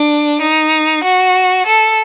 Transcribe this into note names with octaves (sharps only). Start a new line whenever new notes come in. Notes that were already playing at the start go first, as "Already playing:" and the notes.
Already playing: D4
D#4
F#4
A4